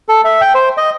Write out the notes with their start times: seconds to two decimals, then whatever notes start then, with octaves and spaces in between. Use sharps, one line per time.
0.09 A4
0.24 E5
0.41 G5
0.55 C5
0.78 D#5